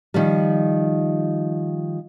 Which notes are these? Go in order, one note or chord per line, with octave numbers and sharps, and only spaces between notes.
D#3 F3 G3